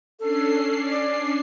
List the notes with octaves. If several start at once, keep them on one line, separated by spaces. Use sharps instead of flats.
C#4 D4 A4 C7
D5